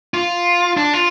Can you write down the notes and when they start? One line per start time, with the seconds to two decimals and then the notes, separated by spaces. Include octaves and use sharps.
0.14 F4
0.77 D4
0.93 F4